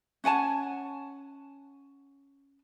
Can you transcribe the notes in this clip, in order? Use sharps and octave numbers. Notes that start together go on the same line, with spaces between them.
C#4 F#5 G#5 A5